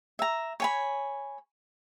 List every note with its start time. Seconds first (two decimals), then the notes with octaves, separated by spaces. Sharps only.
0.19 E5 A#5
0.60 C#5 G#5 B5